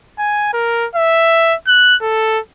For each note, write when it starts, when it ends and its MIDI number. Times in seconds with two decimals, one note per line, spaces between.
0.19 0.50 80
0.54 0.87 70
0.95 1.55 76
1.67 1.96 90
2.02 2.39 69